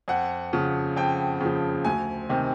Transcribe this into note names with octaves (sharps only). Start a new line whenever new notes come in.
F2 F#5
C#3 F3
F2 G5
C#3 F3
D2 G#5
C3 D#3